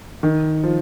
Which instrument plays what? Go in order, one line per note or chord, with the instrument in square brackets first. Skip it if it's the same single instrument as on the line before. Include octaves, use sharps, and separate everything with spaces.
[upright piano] D#3
F3